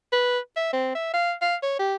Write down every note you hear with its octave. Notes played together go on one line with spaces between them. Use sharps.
B4
E5
C4
E5
F5
F5
C#5
G4